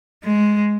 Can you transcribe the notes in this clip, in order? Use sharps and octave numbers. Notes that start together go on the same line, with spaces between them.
G#3